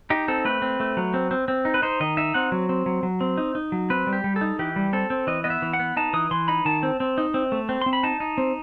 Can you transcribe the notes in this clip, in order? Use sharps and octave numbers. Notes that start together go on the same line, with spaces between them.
D#4 G4
C4 A4
A3 B4
C4
A3
F#3
C4
C4
C4
D#4
B4
D#4 C5
D#3 D#5
D#4 E5
C4 F#5
F#3
C4
F#3
F#3
C4
D#4
D#4
F#3
C4 B4
G3
G4
G3
A4
D#4
E3 G4
G3
C4 A4
C4
E3 D#5
B3 D#5
E5
E3
F#5
B3
D#4 A5
E3 D#6
E3 C6
D#4 B5
D#3 A5
C4
C4
D#4
C4
A3
C4
C4 C6
B5
D#4 A5
D#4
C4